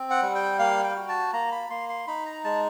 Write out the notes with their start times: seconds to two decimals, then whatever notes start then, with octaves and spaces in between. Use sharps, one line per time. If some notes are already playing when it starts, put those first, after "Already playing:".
Already playing: C4
0.10 F#5
0.22 G3
0.35 G5
0.59 A#3 F5
0.84 G5
0.96 F#4
1.09 A5
1.33 A#3 A#5
1.52 B5
1.70 A#3 C6
1.89 C6
2.07 D#4 B5
2.26 A#5
2.44 G#3 A5